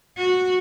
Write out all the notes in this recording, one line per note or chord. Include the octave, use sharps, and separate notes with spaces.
F#4